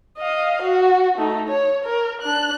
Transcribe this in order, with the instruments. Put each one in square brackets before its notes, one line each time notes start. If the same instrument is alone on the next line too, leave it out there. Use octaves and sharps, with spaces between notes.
[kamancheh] D#5 F5
F#4
A3 D#4
C#5
A#4
D4 F#6